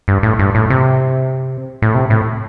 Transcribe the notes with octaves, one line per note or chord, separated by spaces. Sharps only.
G2
A2
G2
A2
C3
A2
C3
A2